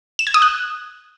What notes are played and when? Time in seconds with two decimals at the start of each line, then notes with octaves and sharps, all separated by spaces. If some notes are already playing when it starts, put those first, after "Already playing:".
0.19 E7
0.27 G#6
0.34 D#6
0.42 F#6